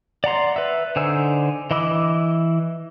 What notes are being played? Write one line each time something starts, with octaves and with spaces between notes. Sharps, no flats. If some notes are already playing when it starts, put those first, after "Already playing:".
D5 F#5 A#5 C6
B4 E5
D3 D#4 C5 G#5 E6
E3 D#5 B5 D6 E6